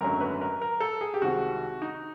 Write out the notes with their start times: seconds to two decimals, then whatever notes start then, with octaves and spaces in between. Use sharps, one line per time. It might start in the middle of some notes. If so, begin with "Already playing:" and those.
0.01 G#1 F#2 D3 F#3 A3 A#4
0.21 B4
0.41 A#4
0.61 A#4
0.80 A4
1.01 G#4
1.14 G4
1.21 C2 C3 D#3 G#3 C4 F#4
1.82 D#4